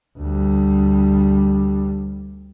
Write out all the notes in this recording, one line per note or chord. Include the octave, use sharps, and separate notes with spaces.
D2 G3